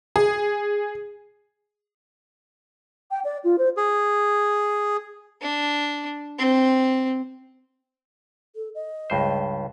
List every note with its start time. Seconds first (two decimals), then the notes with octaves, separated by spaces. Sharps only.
0.16 G#4
3.11 G5
3.24 D5
3.44 F4
3.58 C5
3.77 G#4
5.41 D4
6.38 C4
8.56 A4
8.75 D#5
9.10 C#2 G2 C5